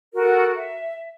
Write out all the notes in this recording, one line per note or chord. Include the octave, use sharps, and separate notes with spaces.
F#4 A4 A#4 F#5
E5